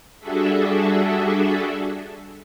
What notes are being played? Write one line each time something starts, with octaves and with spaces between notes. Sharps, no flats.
G3 D4 F#4 G#4 A4 E5